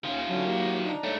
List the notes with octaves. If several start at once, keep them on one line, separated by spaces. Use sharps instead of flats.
D#2 D#3 C#4 F4
D3 F#3 C#4 A5
A#3 G4 A#4
D4 D#4 A#5
G2 A3 C#5